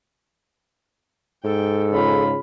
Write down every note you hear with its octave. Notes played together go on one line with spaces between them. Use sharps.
G#2 A4 G5
C#3 F4 B5